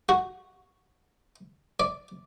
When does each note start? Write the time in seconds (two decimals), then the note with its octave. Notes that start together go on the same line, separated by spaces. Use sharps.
0.09 F#4
1.80 D5